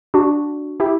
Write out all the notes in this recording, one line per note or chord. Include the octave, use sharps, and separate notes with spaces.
D4 F#4
E4 G4